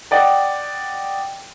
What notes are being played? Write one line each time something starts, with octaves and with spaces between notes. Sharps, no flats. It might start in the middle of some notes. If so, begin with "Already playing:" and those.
D5 D#5 F#5 G5